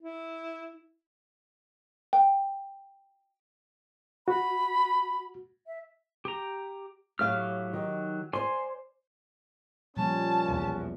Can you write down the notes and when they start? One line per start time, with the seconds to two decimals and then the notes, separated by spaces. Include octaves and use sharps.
0.02 E4
2.13 G5
4.28 F#4 B5
5.67 E5
6.25 G4 A#5
7.19 A2 F#3 G4 F5 F6
7.73 D#3 D#4
8.33 C5 D5 G#5 C6
9.97 A#2 F3 G3 C#4 A5
10.44 B1 E2